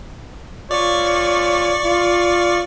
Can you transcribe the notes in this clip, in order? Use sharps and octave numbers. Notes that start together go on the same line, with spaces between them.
F4 C#5 D5 C#6
F4